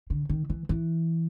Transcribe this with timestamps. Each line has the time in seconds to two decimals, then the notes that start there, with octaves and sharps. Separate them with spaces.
0.10 D3
0.29 D#3
0.50 E3
0.69 E3